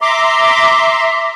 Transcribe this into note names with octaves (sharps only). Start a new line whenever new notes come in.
E5 A#5 C6 D6